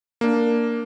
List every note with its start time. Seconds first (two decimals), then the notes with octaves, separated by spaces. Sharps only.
0.21 A#3 D4